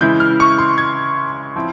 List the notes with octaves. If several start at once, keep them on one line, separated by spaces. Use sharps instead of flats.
C#3 E3 G#3 E4 G6
F6
C#6
C6
G#6
F3 C4 E4